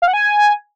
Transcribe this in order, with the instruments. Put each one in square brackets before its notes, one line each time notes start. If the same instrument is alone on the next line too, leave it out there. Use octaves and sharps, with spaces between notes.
[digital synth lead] F5
F#5
G#5